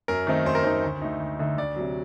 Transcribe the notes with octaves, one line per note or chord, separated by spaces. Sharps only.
F#2 A#4
D#3 A3 C4 D#4
F#2 C5
A#4
D#3 A3 C4 D#4 C5
D2
D3 A3 D#4
D2
D3 A3 D#4
D2 D5
C3 F#3